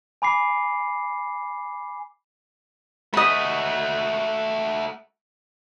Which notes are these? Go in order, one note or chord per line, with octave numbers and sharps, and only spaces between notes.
G#5 B5 D6 C7
A3 F#4 D#5 B5